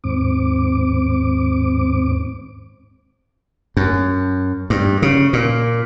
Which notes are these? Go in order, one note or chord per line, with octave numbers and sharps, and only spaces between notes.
D#2 G#2 C4 D6
F#2
G2
C#3
A#2